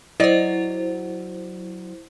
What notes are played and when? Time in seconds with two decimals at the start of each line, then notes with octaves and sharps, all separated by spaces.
0.20 F#3 E4 C5 D5 D#5